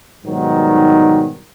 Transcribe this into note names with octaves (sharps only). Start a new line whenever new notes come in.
G#2 B2 D#3 F#3 G3